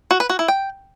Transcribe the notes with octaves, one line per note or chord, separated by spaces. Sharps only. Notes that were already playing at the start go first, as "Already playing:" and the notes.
F#4
B4
F#4
E4
G5